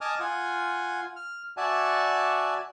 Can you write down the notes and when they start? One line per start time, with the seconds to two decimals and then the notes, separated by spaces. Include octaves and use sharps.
0.01 D#5 G#5 A5 D6 D#6 F6
0.20 F4 F#5 G#5
1.16 F6
1.57 F#4 D5 E5 F#5 G#5 A5